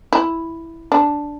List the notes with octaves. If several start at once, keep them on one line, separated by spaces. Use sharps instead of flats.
E4
D4